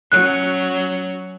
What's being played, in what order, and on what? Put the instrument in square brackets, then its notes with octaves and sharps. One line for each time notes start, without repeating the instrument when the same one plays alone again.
[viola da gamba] F#3 C#4 [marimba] F#6